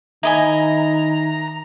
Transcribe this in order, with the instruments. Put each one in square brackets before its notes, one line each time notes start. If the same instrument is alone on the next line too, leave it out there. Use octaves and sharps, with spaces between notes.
[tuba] D#3 [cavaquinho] E4 D#5 G#5 [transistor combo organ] A#5